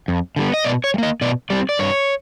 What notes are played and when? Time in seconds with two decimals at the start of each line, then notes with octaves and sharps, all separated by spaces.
0.08 F2
0.36 D3 G3 B3
0.54 D#5
0.65 B2 D5
0.84 C#5
0.94 G3
0.98 A#3 D#5
1.21 B2 D5
1.50 G3 C4 D5
1.69 D5
1.79 G2 C#5